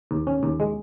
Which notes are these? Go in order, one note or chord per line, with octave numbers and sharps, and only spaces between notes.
D#2
C#4
D#2
G#3